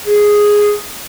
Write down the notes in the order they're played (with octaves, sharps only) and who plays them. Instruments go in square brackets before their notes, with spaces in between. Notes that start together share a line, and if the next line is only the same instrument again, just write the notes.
[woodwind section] G#4